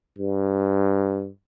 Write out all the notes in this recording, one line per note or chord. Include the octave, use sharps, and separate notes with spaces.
G2